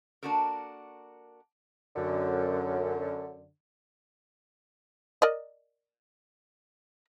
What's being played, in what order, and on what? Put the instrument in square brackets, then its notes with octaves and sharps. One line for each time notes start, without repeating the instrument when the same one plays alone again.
[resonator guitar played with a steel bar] A#3 D4 E4 F#4 A4 A#4
[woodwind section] F#2 D3
[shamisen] A#4 D5 D#5